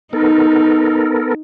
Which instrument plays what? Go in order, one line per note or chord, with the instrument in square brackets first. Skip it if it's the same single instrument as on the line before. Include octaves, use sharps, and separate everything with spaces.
[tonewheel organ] B3 A4 A#4 [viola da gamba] D#4